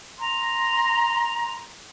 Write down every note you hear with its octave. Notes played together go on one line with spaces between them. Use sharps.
A#5 C6